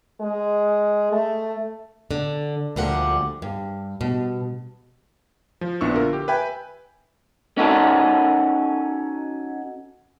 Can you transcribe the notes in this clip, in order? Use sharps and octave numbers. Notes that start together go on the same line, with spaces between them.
G#3
A3
D3
D2 A#2 D3 F3 G3 F#5
G2
B2
F3
A#1 B3 D4 E4 C#6 E6
D3 F4 A#4
G4
B4 E5 G5 G#5 B5
C#4 D#4 F#4 A4